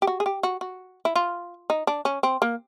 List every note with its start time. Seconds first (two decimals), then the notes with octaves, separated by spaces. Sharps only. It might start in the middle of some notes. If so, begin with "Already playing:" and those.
0.02 G4
0.07 F#4
0.20 G#4
0.26 G4
0.43 F#4
0.61 F#4
1.05 E4
1.16 F4
1.70 D#4
1.87 D4
2.05 C#4
2.23 C4
2.42 A#3